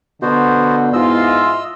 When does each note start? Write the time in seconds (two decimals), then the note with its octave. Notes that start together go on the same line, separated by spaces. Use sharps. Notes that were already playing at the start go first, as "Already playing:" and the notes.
0.22 B2 D3 B3 F#4 C5
0.93 G#2 E4 F4 D#5 E6